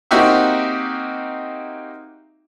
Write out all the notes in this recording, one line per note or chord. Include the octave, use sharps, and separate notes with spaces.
A#3 C4 D#4 F#4 G4 E5